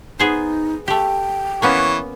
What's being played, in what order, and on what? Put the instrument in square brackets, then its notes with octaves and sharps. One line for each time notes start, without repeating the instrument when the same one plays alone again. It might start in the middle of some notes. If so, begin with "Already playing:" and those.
[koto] B3 G#4 C5 [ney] D#4
[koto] A3 G4 [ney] G5
[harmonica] E3 C#5 [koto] A#3 B3 C#4